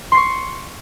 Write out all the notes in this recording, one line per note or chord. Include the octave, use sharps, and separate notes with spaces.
C6 C#6 C7